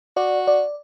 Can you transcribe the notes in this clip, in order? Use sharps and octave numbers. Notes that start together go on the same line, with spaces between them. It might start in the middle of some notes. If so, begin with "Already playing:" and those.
F#4 D5
D5